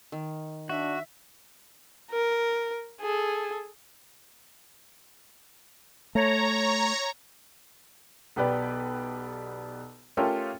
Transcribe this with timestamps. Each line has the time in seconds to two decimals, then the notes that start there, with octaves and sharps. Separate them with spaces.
0.12 D#3
0.69 D4 F#4 E5
2.11 A#4
3.01 G#4 A4
6.15 A3 C#5 A#5
8.36 B1 B3 G4 B4 D5
10.17 A3 C#4 F4 G4 A4 A#4